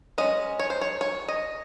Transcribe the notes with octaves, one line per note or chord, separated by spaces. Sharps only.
G#3 C#4 D#5
C#5
C5
C#5
C#5
D#5